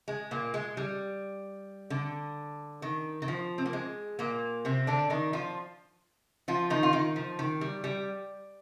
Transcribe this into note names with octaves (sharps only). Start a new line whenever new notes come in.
G#3
A#2 A#3
G#3
G3
D3
D#3
D#3
F3
C4
A#3
G#3
A#2 A#3
C3 C4
D3 D4
D#3 D#4
F3 F4
F3 F4
D#3 D#4
F4
D#3 D#4
F3
D#3
G3
G3